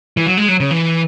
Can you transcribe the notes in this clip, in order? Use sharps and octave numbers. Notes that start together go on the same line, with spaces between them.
E3
F#3
G#3
F#3
C#3
E3